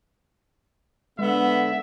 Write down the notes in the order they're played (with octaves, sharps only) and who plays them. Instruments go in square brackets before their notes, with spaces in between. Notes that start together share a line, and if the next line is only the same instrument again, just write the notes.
[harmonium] D3 [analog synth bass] G#3 [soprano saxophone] B3 [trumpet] E5